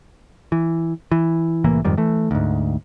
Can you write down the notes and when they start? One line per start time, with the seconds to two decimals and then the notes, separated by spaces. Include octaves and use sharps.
0.52 E3
1.12 E3
1.64 C2 A2 E3 A#3
1.85 F2 G#2 D#3 G3
1.97 E3 A3
2.31 D2 G#2